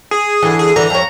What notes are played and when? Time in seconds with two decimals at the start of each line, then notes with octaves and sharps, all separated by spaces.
0.11 G#4
0.42 D3 E3
0.59 G#4
0.76 D3 E3 A#5
0.90 F2 C#5